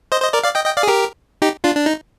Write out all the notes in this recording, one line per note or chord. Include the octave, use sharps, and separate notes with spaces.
C5 D#5
C5 D#5
A#4 D5
D5 F5
D#5 G5
D#5 G5
D5 F5
G#4
G4 A#4
D#4 G4
D4 F4
D4
D#4